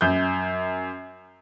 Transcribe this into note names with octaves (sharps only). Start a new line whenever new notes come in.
F#2 G6